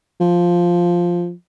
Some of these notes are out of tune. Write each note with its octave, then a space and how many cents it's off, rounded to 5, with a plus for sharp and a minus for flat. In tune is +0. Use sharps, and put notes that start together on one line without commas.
F3 +0